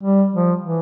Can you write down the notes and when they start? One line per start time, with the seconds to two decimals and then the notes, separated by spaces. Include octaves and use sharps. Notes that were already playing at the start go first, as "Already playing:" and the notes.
0.03 G3
0.33 F3
0.61 E3